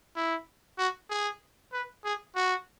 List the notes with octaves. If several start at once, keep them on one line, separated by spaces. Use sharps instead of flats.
E4
F#4
G#4
B4
G#4
F#4